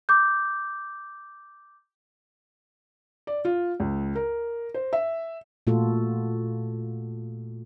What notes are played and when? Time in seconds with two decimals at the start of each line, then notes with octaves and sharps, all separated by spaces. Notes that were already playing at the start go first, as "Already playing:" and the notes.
0.09 D6 G6
3.27 D5
3.45 F4
3.80 C#2
4.15 A#4
4.74 C5
4.93 E5
5.67 A#2 A3 F4 F#4 A4